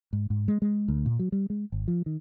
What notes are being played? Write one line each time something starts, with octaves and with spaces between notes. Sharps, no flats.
G#2
G#2
G#3
G#3
D2
A#2
F#3
G3
G#3
G#1
F3
D#3